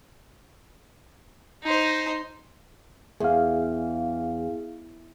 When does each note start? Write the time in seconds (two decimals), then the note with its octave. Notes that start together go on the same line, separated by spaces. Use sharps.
1.63 D#4 C5
3.20 E2 G#4 F5